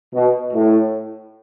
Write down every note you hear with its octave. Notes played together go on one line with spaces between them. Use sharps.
B2
A2